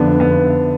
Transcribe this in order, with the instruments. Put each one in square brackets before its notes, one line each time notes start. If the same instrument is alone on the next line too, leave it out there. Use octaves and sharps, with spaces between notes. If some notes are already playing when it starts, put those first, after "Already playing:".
Already playing: [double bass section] F2 D3 F3 [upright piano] B3 D4
[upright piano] B3